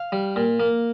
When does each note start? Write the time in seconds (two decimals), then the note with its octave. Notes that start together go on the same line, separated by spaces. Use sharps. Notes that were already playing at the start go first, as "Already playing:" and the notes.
Already playing: F5
0.12 G3
0.36 A#2
0.60 A#3